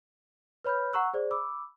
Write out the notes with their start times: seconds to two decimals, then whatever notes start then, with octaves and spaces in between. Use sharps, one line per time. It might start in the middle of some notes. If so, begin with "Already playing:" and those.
0.64 B4 C#5 B5 F6 G6
0.93 F#5 A#5 C#6 E6 F#6
1.14 G#4 C5 D5
1.31 B5 D6 E6